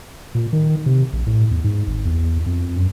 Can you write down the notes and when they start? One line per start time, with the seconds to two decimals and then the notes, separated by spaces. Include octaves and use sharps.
0.35 A#2
0.53 D#3
0.86 C3
1.13 A#1
1.27 A2
1.51 E2
1.64 G#2
1.87 G#1
2.05 E2
2.46 F2
2.76 F#2